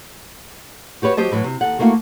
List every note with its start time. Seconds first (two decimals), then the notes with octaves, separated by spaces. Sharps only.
1.02 F#4 G4 B4 C#5
1.17 F#3 G4 C5 D#5 A5
1.32 A2 E3 F#3
1.44 C3
1.61 D#2 A4 F#5
1.79 A3 A#3 E4 F#4 F5